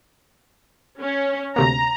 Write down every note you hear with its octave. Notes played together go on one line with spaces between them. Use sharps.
C#4
D2 C3 A#3 A#5